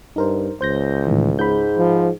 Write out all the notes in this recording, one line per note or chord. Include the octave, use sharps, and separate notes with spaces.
G2 D#4 A#4 C5
C#2 C5 G6 A#6
A2 D#3 E3
G#2 B5 G6
F3